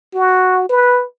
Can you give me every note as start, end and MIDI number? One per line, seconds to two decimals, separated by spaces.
0.14 0.65 66
0.69 1.04 71